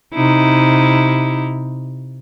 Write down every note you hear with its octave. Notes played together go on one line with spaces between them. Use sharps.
C3 D#4 E4